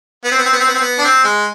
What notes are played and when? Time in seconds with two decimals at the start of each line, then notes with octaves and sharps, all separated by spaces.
0.24 B3
0.31 C4
0.38 B3
0.45 C4
0.53 B3
0.60 C4
0.67 B3
0.74 C4
0.81 B3
0.99 D4
1.04 C4
1.24 G#3